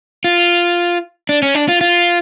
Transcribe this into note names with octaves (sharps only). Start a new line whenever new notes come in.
F4
D4
C#4
D4
F4
F4